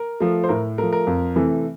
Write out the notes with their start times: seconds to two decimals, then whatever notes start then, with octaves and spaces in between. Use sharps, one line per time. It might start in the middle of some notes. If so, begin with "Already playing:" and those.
Already playing: A#4
0.20 F3 A3
0.44 C5
0.49 A2 A#4
0.78 F3 A3 A#4
0.93 A#4
1.07 F2
1.35 C3 E3 A3